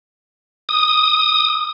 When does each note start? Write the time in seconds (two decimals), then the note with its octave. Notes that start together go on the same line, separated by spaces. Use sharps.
0.69 D#6